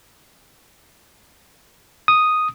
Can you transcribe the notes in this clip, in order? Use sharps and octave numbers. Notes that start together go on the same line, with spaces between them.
D#6